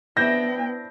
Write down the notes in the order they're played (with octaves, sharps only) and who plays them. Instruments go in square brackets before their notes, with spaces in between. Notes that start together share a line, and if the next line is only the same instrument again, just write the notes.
[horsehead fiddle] B3 G5 [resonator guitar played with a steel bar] C4 D4 E4 [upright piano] G6 [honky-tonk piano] A#6